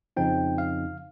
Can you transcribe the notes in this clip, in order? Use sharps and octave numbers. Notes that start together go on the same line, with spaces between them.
F2 C#3 F3 C4 D#4 G5
F5